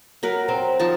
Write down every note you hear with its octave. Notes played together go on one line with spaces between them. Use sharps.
F#3 A#4 B4
C4
F3 D#4 A5